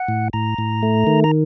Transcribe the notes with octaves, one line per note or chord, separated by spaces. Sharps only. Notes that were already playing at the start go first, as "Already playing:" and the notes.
Already playing: F#5
A2
A2 A#5
A2
A3
D#3
A#5